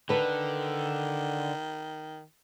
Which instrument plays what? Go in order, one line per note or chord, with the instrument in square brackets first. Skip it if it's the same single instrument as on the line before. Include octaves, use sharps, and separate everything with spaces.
[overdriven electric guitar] D3 [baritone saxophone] D#3 [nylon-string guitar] A4 B4